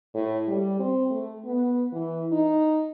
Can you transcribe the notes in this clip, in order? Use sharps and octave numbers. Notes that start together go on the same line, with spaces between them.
A2
G3
C4
A3
B3
E3
D#4